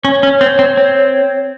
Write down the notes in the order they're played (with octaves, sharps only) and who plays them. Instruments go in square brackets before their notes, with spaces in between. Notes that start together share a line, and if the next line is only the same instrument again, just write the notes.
[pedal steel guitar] C#4 [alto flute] C#5
[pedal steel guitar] C#4
C4
C4
C4